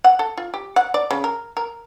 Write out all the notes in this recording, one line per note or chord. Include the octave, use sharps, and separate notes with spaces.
F#5
A4
F4
G4
F#5
D5
C#3
A#4
A#4